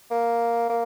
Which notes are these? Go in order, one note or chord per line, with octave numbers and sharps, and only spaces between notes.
A#3
A#3